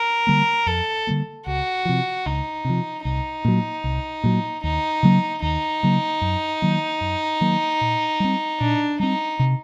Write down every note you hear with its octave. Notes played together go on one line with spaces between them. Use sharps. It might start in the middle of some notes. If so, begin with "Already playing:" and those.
Already playing: A#4
D3 G3 A#3
F2 A4
D3 G3 A#3
C#2 F#4
C3 F3
C#2 D#4
C3 F3
C2 D#4
A#2 F#3
C2
A#2 F#3
D#2 D#4
C#3 F#3 A#3
D#2 D#4
C#3 F#3 A#3
F#2
D#3 F#3 A#3
F#2
D#3 F#3 A#3
A#2
G3 C4
A#2 D4
G3 C4 D#4
C3